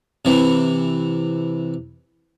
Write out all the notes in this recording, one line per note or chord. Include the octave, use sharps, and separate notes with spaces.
C3 E3